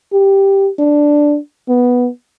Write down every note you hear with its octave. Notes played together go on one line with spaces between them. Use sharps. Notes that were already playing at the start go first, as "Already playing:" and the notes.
G4
D4
B3